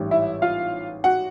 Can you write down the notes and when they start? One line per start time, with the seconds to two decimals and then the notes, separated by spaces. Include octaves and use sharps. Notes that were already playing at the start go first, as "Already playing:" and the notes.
Already playing: A1 G#2 E3 G3
0.11 E4 E5
0.42 F4 F5
1.04 F#4 F#5